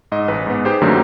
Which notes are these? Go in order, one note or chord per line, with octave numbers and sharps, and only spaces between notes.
G#2 D#5
A1 B4
G#2 B3
D#4 G4 G#4 C5
F#2 D3 D#3 F#3 A3 A#3